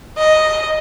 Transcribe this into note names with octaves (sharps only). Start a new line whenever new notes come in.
D#5